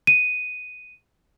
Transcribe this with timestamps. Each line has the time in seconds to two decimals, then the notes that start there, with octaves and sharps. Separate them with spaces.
0.07 D#7